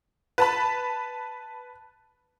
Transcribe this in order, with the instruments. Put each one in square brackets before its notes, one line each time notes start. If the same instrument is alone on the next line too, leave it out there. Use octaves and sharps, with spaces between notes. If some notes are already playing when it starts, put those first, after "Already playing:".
[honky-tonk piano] B4 A5 B5